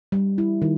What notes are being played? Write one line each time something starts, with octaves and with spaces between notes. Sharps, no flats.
G3
E4
D#3